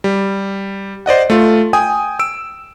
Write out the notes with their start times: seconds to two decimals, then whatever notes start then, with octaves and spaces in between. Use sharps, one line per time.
0.04 G3
1.06 C5 D5 D#5 F#5
1.30 A3 F4
1.73 G5 G#5 D#6
2.19 E6 D7